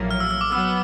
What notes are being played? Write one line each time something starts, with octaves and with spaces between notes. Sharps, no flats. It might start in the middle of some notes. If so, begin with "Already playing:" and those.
Already playing: A#1 A2 F#3 A#3
F6
E6
E6
D6
F#3 B3 E6